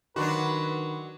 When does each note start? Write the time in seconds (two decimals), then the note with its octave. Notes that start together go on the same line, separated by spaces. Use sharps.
0.16 D#3 F#3 D4 F#4 B4 C6 C#6